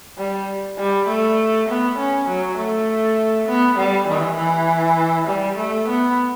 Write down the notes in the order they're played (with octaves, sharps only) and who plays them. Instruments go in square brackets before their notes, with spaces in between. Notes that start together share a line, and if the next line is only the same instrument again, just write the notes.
[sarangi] G3
G3
A3
B3
C#4
F#3
A3
B3
G3
E3
E3
G3
A3
B3